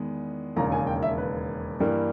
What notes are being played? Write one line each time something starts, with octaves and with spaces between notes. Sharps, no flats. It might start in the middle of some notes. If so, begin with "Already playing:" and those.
Already playing: E2 D#3 G#3 B3
E1 D#2 C#3 A#5
G#5
G5
E5
B4
G2 E3 G3 A#3